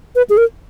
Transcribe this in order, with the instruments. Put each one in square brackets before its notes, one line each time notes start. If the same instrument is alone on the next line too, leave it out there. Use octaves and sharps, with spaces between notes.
[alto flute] B4
G#4
A#4